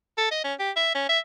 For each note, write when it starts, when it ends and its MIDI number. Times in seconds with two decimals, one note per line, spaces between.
0.18 0.30 69
0.31 0.40 75
0.44 0.54 61
0.59 0.71 67
0.76 0.94 76
0.95 1.05 61
1.09 1.19 76